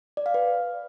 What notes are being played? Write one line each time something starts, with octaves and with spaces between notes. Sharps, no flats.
D5
F5
B4